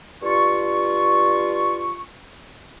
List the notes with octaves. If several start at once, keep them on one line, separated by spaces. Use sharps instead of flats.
G2 F4 C#6